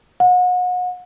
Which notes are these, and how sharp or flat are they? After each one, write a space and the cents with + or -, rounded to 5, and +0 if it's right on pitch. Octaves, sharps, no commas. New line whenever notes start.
F#5 -35